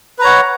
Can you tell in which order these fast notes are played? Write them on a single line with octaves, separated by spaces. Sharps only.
B4 A#5 C#5 F#5